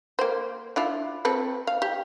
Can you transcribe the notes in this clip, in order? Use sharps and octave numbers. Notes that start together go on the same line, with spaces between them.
A#3 C5
D4 E4 F4
C4 A4 B4
F5
G4